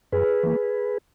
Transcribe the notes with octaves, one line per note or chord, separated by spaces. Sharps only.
F#2 G#4 B4
E3 A#3